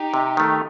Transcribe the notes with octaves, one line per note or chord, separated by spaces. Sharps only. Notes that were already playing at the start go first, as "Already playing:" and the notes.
Already playing: D#4 G4
C3
D#3 A3